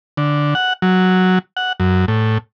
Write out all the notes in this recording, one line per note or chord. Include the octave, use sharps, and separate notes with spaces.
D3
F#5
F#3
F#5
F#2
A2